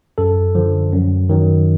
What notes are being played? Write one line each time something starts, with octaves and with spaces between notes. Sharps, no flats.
F#2 A4
D3 F3
F#2
D#3 F#3